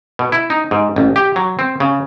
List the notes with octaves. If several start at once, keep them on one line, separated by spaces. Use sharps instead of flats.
B2
E4
D#4
G#2
A1
G4
F#3
C4
C#3